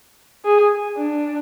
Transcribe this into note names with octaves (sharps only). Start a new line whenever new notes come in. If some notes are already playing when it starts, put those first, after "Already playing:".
G#4
D4